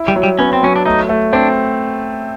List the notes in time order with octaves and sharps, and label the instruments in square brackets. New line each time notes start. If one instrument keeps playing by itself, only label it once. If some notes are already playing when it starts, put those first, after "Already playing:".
Already playing: [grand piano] E4
[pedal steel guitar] G3
[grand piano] F#3
[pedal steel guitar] G3
[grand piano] B3 [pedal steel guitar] C#4
[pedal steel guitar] C4
[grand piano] F#3 [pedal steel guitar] C#4
[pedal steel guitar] D4
[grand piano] A3 [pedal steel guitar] D#4
[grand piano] A3
[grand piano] C4 [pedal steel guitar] D4